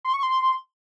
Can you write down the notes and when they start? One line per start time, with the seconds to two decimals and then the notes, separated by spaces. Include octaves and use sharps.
0.05 C6
0.14 C#6
0.23 C6